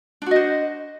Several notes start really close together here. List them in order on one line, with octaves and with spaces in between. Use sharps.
D4 F#4 D#5 C5